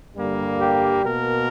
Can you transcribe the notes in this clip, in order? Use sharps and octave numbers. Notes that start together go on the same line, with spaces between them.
G2 D3 G3 A#3
G4
B2 A#3 A#4